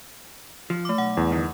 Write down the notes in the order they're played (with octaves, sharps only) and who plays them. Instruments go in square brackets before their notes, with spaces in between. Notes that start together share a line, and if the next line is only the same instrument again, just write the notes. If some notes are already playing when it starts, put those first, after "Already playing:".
[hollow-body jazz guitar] F3
[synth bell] A3 D6
[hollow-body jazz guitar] B1 [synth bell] F#5
[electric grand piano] E2
[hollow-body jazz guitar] D2 G2 D#3